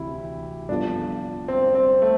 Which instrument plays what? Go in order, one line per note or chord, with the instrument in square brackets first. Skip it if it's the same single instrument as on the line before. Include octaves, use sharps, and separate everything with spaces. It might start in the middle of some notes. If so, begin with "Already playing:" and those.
Already playing: [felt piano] D2 C3 E3 [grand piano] E4 G4
[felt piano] G2 F3 B3 F4 A4 [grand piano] D4
[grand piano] C4
C4
A3